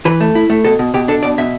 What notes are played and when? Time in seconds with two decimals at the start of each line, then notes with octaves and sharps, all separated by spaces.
0.05 E3 B4
0.20 A3
0.35 E4
0.50 A3
0.65 B2 A4
0.79 B2
0.94 B2 G4
1.08 D4 A4
1.23 B2 D5
1.38 B2 E5